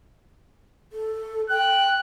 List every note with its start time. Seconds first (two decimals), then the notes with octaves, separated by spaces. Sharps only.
0.93 A4
1.50 G5 F#6